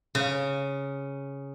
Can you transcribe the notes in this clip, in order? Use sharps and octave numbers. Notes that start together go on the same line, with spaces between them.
C#3